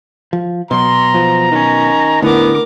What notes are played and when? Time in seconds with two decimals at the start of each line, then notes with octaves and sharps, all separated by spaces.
0.33 F3
0.71 B2 F#3 A#5 C6
1.14 F3
1.52 D#3 C#4
2.22 A2 D3 B3 A#4 D6